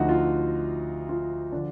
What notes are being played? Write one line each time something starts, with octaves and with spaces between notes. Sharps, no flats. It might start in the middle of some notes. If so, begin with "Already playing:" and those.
Already playing: D2 D3 F3 D#4 F#4
F4
F4
D3 F3 D4